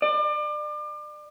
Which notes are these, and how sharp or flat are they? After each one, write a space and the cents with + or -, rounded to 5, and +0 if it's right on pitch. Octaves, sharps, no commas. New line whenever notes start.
D5 +35